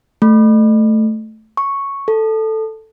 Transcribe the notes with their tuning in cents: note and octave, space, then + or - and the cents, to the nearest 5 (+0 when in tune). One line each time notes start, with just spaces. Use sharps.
A3 -5
C#6 -5
A4 +0